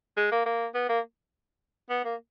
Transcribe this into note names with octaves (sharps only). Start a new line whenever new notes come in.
G#3
A#3
A#3
B3
A#3
B3
A#3